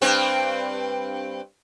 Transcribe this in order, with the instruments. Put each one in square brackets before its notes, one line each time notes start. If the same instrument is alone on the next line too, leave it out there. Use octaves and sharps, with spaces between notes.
[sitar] G2 C4